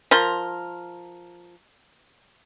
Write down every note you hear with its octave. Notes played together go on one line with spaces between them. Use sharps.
F3 A#4 C6